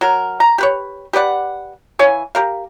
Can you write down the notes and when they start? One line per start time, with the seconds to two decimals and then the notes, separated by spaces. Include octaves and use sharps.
0.01 F#3 A#4
0.40 A#5
0.58 G4 B4 C#5
1.13 G4 B4 D5 F#5
1.99 E3 C#5 F5 G#5
2.35 G4 A#4 F5